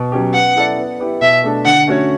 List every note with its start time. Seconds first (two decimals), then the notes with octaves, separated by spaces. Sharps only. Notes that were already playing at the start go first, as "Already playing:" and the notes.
Already playing: B2
0.12 F#3 C#4 G4
0.34 B3 F#5
0.56 E4 A4 D5
0.77 B3
1.00 E4 G4 B4
1.21 B2 E5
1.44 A3 D4 A4
1.65 D3 F#5
1.87 A3 C#4 F#4 C#5